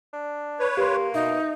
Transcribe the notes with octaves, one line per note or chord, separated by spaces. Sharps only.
D4
B4 C#5
A#3 G4 C6
B2 D#4 E5